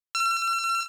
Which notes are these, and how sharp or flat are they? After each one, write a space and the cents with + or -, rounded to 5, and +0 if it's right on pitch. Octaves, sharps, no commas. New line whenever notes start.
E6 +45